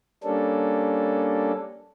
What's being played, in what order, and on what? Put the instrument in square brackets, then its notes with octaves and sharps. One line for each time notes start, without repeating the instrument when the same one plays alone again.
[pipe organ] G3 A#3 C#4 D4 A4